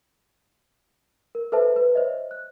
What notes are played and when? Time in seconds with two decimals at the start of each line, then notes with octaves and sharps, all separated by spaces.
1.35 A#4
1.52 A4 B4 C5 E5 A5
1.76 B4
1.95 C5 C#5 D#5 E5
2.31 F#6